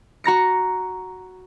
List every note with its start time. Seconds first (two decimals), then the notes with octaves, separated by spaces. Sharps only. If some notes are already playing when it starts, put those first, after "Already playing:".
0.24 F#4 A#5 A#6 C#7